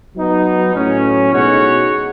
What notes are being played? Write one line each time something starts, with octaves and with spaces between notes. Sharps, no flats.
F#3 B3 D#4
A2 F#3 C#4
B2 G#3 D#4 F#4 C#5